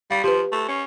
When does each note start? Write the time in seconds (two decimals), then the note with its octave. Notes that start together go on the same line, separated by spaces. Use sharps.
0.11 G3 F5
0.24 F3 G4 B4
0.52 A3
0.68 C#4